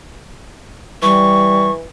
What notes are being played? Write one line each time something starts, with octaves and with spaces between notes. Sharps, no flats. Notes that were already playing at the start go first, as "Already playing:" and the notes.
E3 G3 C#6